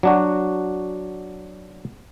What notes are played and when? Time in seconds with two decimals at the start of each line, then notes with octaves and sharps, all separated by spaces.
0.03 F#3 D4 F#4